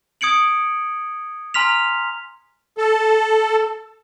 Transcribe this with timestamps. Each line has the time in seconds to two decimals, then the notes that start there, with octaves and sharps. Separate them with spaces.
0.21 D#6 G#6 C#7 D7 F#7
1.54 G#5 A#5 C6 F6 B6 F7
2.78 A4